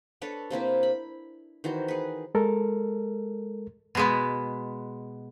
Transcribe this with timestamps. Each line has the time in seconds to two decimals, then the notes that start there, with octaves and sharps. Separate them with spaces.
0.22 D4 A4 B4 C#5
0.51 C3 A#3 C4 E4
0.83 B5
1.64 D#3 E3 F#4 C5
1.88 G#4 B4
2.35 G#3 A4 A#4
3.95 B2 G#3 B3